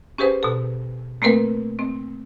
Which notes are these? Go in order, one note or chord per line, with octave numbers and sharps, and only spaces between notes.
C#4 G4 G#4 B4 C5
B2 A4
A3 A#3 C4 A#4 B4
C4